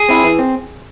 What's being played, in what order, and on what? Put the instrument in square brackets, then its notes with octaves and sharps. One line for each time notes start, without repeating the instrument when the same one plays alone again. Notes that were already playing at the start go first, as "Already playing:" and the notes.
Already playing: [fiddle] G#4
[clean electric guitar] C4 E4
E3
C4